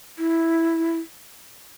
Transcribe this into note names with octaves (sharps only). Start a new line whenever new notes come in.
E4